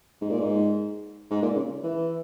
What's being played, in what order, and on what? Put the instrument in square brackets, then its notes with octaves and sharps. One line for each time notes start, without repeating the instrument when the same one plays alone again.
[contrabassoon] G#2
A#2
G#2
G#2
A#2
C#3
E3